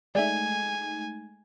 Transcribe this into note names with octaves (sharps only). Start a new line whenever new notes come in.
G#3 A3 D#4 D5 E5 G#5